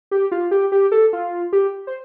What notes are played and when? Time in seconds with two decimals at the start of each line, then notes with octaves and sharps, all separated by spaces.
0.11 G4
0.32 F4
0.51 G4
0.72 G4
0.92 A4
1.13 F4
1.53 G4
1.87 C5